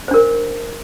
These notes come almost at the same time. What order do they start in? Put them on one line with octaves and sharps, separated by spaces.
C5 D4 A#4